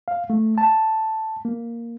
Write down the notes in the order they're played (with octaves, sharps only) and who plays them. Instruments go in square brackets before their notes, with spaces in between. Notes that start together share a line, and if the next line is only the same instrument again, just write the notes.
[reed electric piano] F5
A3
A5
A#3